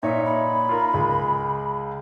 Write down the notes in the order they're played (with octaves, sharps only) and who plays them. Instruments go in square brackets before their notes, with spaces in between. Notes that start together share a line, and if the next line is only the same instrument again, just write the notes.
[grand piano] A#2 D#4 C#5 [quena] E5
[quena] B5
[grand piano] F4 A#4
C#2 G#3